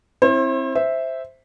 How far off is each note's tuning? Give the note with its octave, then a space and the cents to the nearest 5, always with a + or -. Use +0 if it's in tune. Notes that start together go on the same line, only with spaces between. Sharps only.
C4 +20 E4 +0 C5 +40
C5 +0 E5 -5